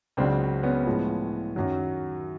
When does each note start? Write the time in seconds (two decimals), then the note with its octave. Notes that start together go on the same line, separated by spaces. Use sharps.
0.17 C#2 C#3 F#3 C4 D4
0.63 B3 C#4
0.86 A2 F3 G#3
1.56 F#2 D#3 F#3